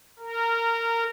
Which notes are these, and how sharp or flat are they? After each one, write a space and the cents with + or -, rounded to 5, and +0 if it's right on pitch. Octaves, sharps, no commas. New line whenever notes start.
A#4 -20